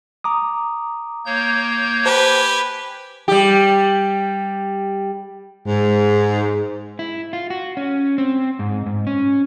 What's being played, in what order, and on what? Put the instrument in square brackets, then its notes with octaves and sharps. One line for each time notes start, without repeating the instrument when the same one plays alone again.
[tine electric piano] A#5 D6 D#6
[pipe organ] A#3 C#5 G6
[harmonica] G4 B4 G#5 [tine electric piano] C5 A5
[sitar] G3 G4
[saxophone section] G#2
[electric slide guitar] E4
F4
F#4
C#4
C4
G#2
G#2
C#4